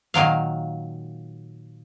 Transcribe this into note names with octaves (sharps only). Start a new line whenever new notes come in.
A#2 D#3 F#3 F5